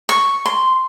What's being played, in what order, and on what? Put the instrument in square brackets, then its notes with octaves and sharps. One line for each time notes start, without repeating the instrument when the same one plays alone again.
[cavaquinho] C#6
C6